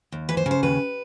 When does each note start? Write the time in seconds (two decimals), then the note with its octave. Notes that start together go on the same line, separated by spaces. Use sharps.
0.12 D#2
0.29 E3 B4
0.37 C5
0.46 C#3
0.51 C5
0.63 D#2 B4